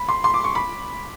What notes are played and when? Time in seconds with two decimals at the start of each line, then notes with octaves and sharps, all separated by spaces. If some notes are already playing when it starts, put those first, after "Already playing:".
Already playing: B5
0.09 C6
0.24 C6
0.34 D6
0.44 C#6
0.55 B5